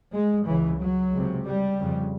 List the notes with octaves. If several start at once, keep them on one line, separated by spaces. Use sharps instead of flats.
G#3
C#2 C#3 E3
F#3
C#2 C3
G3
F2 C#3